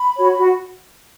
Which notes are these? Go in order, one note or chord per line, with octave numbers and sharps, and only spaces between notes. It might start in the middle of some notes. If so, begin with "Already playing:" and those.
Already playing: B5
F#4 C#5
F#4